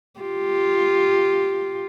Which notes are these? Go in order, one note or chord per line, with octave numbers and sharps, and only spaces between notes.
F4 G4